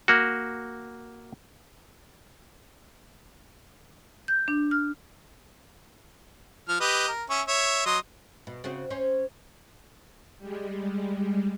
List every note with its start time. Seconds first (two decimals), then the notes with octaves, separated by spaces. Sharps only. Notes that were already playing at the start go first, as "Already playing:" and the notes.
0.08 A#3 F#4
4.28 G6
4.48 D4
4.71 F6
6.68 F3 F6
6.80 G4 B4 D#5
7.08 A#4
7.30 C#4 E5 C#6
7.48 C#5 E5
7.86 F#3 D#5 C6
8.47 B2
8.64 C#3 C4 F#4
8.90 C#4 C5 C#5
10.39 G3 G#3